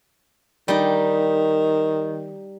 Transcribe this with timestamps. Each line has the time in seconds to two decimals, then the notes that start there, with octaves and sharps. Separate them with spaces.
0.68 D#3 G3 D#4